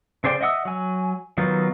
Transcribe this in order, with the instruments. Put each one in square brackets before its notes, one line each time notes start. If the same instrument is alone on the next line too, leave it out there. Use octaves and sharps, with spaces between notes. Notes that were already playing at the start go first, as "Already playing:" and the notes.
[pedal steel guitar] C#3 G#4 C5 D5 G5
D#5 E5 F#5 D#6 E6
F#3 G#5
D#3 F#3 B3 D#4 F4